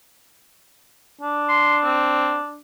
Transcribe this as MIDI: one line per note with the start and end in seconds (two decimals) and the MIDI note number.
1.21 2.60 62
1.49 1.77 84
1.84 2.35 60